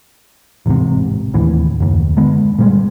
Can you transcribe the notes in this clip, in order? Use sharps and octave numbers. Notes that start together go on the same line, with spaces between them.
A1 E2 G#2 C3
D1 D#2 A2 E3
F#1 D#2
D3 G#3 B3
A#2 G3 G#3